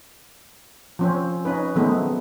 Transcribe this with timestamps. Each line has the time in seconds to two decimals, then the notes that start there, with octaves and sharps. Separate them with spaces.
0.99 F3 C4 C#4
1.45 C#4 D#4 B4
1.75 D#3 F#3 G#3 A3 B3 C4